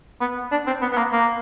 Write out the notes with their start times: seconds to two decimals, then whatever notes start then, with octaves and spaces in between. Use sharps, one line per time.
0.21 B3
0.52 D4
0.67 C4
0.82 B3
0.92 B3
0.98 A#3
1.13 A#3